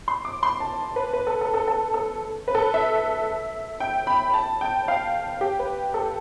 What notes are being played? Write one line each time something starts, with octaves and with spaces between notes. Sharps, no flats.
C6
D6
C6
A5
B4
B4
A4
A4
A4
A4
A4
B4
A4
B4
E5
G5
B5
A5
G5
F5
G4
B4
A4